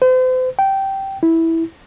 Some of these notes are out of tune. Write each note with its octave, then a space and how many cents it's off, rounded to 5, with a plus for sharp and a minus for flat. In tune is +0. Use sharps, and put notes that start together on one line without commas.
C5 -40
G5 -10
E4 -10